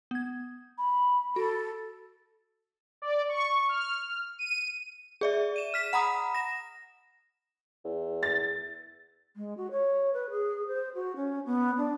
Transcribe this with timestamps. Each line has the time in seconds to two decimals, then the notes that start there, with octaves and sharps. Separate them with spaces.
0.11 B3 G#6
0.78 B5
1.36 F#4 A4
3.02 D5
3.29 C#6
3.69 F6
4.39 D#7
5.21 G#4 D5 E5
5.56 D#7 E7
5.74 F6 B6 E7
5.93 F#5 A#5 B5 D#6
6.34 A#6 E7
7.84 E2
8.23 A6
9.36 G#3
9.57 F#4
9.71 C#5
10.14 B4
10.30 G#4
10.67 C5
10.95 F#4
11.16 C#4
11.46 B3
11.78 D4